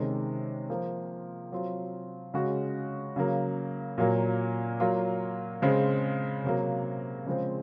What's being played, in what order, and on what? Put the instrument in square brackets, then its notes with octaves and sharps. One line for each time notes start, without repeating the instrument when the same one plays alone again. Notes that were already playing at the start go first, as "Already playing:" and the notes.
Already playing: [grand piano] C3 D#3 G#3 C#4
F3 A#3 F4
F#3 C4 F4
C#3 G#3 C#4 F#4
C#3 F#3 A#3
A#2 F#3 A#3
F#3 A#3 F4
C#3 G#3 C4
C3 F#3 A#3
C#3 F3 G#3 C4